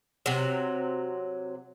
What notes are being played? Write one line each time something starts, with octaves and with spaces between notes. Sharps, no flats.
C3 F#3